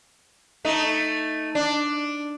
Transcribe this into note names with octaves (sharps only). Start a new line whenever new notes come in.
A3 D#4
D4